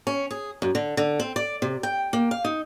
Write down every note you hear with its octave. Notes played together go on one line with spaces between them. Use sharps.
C#4
G#4
F#2
D3
D3
C4
D5
C3
G5
A#3
F5
D#4